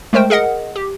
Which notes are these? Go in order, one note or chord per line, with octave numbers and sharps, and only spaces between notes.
G#3 A3 A#4 C5 G5
G#4 A#4 D#5 F#5
G4